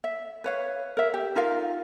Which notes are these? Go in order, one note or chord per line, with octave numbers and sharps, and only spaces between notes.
E5
B4 C#5 F5
A#4 E5
G4
D#4 F4 A#4 F5